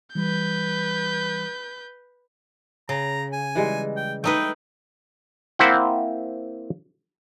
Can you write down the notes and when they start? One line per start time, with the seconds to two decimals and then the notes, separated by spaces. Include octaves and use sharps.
0.15 E3 G3 B4 G6
2.89 C#3 A#5
3.33 G#5
3.55 E3 G3 G#3
3.97 G5
4.24 A3 D#4 B4 G5
5.59 A#3 C4 E4 C5 E5 F#5